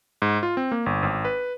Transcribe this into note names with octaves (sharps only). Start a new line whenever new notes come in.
G#2
F4
C4
A#3
G1
G#1
B4